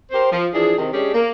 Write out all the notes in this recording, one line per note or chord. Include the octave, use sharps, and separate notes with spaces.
G4 A#4 C5
F3
E3 F3 D4 G#4
C3 D#3
G#3 C#4 D4 G4 G#4
A#3